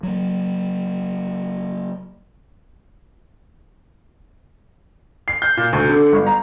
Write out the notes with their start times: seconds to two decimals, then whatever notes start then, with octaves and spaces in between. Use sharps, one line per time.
0.03 F#3 A#3
5.28 C7
5.42 G6
5.57 A#2
5.73 D2
5.90 D3
6.13 G1
6.26 A#5